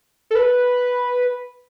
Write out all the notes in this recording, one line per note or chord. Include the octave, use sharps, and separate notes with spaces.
A4
B4